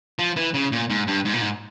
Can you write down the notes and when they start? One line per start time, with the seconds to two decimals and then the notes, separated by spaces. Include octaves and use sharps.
0.19 F3
0.36 E3
0.54 C#3
0.72 A#2
0.90 G#2
1.07 G2
1.25 G#2
1.33 A#2
1.41 G#2